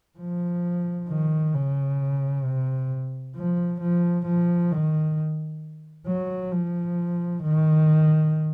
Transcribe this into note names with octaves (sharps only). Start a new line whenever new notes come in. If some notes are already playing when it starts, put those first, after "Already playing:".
F3
D#3
C#3
C3
F3
F3
F3
D#3
F#3
F3
D#3